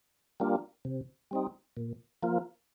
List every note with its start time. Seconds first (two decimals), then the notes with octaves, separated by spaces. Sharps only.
0.40 G3 A#3 D4 F4
0.85 C3
1.31 G3 C4 D#4
1.77 A#2
2.23 F3 A#3 F4